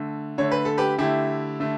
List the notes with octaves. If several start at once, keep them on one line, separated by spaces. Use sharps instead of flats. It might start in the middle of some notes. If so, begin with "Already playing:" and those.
Already playing: D3 A3
D3 A3 C#5
B4
A4
G4 B4
D3 A3 E4 G4
D3 A3